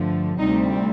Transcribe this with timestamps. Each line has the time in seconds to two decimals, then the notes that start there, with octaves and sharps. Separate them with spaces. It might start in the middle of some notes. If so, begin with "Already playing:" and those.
Already playing: G2 D3 F3 A3
0.39 D2 C3 G3 C4 D#4